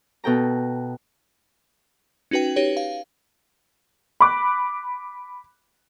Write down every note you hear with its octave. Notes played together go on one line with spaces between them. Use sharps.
B2 A4 G5 A#5
C#4 D#4 F#4 B4 G5
D#4 G4 B4 C#5
F5
B5 D6 F#6